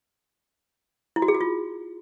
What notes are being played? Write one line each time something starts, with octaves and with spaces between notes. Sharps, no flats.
E4
F#4
G#4
F#4
F4